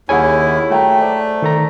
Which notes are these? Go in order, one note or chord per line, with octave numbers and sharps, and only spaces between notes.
D#2 E4 G#4 C#5 E5 F#5 G#5
A3 F#4 G5 A#5
C5 D5
D#3 A4 A#5